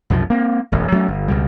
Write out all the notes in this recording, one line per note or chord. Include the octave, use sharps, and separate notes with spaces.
C2 F#2 B2 F3
A#3 C4
E1 A1 F#2
F#3 A3 B3 C#4
G1
C#2 B2 G3